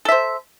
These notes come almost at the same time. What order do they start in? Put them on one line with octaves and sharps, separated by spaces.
A4 E5 C5